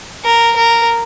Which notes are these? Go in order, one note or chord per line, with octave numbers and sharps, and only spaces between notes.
A#4
A#4